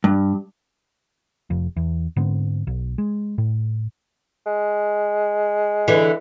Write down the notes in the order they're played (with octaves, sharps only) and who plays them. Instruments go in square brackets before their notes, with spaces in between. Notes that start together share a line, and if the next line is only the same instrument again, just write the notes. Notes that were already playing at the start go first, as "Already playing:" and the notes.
[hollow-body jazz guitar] G2
[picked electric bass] F1 F2
E2
G#2 D3 B3 C4
B1
G#3
A2
[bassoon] G#3
[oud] D3 E3